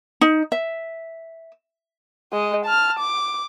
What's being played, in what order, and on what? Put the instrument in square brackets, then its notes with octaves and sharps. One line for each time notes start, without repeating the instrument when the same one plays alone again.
[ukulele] D#4
E5
[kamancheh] G#3 D#5
A5 F6
D6